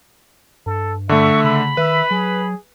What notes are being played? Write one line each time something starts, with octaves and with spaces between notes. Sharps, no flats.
G2 A4
D3 A3 E5 C#6
C#3 B5
D#3 B4 E5
F#3 G#4